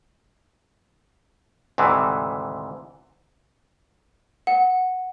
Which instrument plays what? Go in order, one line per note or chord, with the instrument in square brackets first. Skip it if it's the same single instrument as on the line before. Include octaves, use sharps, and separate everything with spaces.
[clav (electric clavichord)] D2 G#2 C3 D#3 E3
[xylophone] F#5